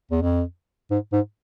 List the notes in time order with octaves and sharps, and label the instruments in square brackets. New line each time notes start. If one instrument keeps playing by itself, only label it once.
[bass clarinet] E2
F2
G#2
G#2